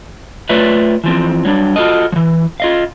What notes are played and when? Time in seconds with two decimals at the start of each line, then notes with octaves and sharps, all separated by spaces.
0.49 A3 F4 B4 C#5 D5 E5
1.04 E3 F3 C4
1.45 F#3 G3 D4
1.76 F4 F#4 A4 D#5
2.12 E3 F3
2.60 F4 D#5 F5